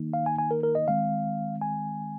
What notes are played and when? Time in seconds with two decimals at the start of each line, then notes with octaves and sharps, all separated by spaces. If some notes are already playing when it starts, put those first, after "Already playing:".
Already playing: D#3 A#3 D#4
0.14 F5
0.26 G#5
0.39 G#5
0.51 A#4
0.63 A#4
0.75 D#5
0.88 D#3 G#3 C4 F5
1.61 G#5